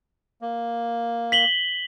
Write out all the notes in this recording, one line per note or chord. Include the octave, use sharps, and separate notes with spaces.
A#3
B6 F#7 G7